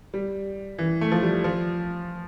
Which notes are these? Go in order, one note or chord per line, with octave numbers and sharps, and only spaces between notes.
G3
E3
A3
F3
G3
F3